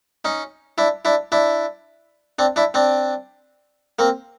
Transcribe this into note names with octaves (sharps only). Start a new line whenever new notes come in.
C#4 D#4
D4 E4
D4 E4
D4 E4
C4 D4
D4 E4
C4 D4
A#3 C4